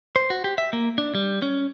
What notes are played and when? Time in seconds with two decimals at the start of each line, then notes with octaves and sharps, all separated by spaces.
0.16 C5
0.30 F#4
0.44 G4
0.58 E5
0.73 A#3
0.98 D4
1.15 G3
1.42 C#4